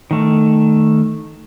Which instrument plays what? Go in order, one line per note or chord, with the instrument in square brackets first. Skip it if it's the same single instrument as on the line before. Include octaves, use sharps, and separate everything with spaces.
[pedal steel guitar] D#3 A3